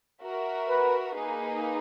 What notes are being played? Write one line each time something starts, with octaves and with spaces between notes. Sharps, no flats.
F#4 A#4 E5
B4
A#3 D#4 G#4 B4